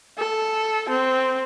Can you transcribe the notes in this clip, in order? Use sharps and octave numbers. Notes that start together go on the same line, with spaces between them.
A4
C4